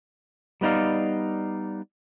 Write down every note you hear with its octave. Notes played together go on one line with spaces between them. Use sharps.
G3 B3 D#4 D5 F5